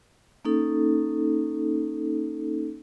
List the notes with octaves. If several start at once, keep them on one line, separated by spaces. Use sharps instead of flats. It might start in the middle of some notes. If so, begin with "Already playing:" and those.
A#3 C#4 D#4 A4